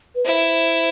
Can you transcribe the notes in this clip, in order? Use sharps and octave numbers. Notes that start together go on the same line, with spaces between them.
B4
E4 C5